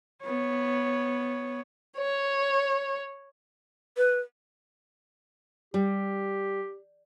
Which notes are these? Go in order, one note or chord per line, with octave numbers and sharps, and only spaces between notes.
B3 C#5
C#5
B4
G3 G4